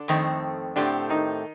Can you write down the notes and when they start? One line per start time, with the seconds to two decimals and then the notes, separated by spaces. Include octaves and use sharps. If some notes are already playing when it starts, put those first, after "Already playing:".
Already playing: D3 D4
0.08 F2 D#3 A3 C4
0.76 A2 D3 A3 C4 D4 G4
1.09 D#3 D#4